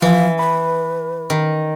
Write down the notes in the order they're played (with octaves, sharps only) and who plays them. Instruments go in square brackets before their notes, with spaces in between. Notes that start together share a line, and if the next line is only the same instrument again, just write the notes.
[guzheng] E3 [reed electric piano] F3 [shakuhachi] F5
[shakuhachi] B4 [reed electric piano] B5
[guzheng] D#3